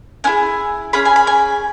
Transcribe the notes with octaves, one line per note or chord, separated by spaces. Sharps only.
C#4 E4 G#4 G#5
C#4 G#4 B5
G#5
B5
G#5